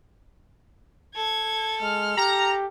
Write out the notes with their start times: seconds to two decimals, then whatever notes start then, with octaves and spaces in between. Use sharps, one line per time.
1.16 A4 G#6
1.81 G#3 F6
2.17 G4 A#5